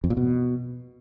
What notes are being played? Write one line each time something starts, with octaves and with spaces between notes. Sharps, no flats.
F2
A#2
B2